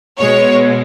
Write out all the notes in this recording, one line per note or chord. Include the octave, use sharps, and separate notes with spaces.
B2 G#3 C#5